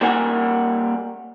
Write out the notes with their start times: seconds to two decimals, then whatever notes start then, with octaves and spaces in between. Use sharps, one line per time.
0.01 G3 A#3 F#5 G#5